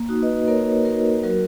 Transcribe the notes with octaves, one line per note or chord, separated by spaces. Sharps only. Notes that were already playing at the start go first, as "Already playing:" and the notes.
Already playing: A#3
D#4 F#4
B4 D#5
A#3 A#4 C#5
D#4 F#4 A#4
F#3 F#4 A#4